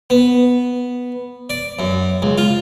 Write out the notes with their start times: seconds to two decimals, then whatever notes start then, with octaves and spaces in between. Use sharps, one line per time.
0.10 B3
1.50 D5
1.79 F#2
2.22 C#2
2.38 F4